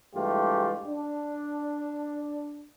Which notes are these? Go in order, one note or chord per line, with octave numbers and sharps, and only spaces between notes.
G2 E3 G#3 A3 F4 G4
D4